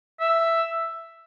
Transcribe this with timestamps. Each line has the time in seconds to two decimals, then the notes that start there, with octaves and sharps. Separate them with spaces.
0.20 E5